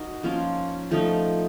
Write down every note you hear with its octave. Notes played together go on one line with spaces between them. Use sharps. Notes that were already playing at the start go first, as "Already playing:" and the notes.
Already playing: D#4 F#4 A#4
F3 A#3 C#4 F4
F3 A3 D#4